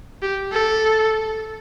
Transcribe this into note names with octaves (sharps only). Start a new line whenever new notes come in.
G4
A4